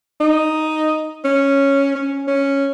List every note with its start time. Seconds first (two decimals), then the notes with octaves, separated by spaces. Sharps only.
0.20 D#4
1.25 C#4
1.95 C#4
2.27 C#4